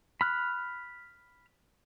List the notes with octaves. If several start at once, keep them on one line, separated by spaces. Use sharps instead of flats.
B5 F6 F#6